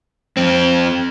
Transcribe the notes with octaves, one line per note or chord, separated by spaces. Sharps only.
F2 C4